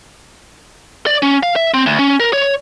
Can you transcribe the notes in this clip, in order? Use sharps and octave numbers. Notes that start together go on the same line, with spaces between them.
D5
C#4
F5
E5
C4
D2
C#4
A#4
C#5